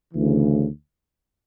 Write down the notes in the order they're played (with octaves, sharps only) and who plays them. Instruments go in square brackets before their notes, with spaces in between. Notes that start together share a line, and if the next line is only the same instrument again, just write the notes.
[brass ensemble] D2 C#3 E3